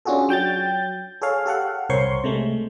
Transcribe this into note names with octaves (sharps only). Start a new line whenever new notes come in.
C#4 D4 F4 F#4 G#4 A4
F#3 G5 G6 A6
G#4 A4 C#5 F5
G4 A4 F5 F#5
C2 A#4 C5 C#5 C6 C#6
C3 G#3 A3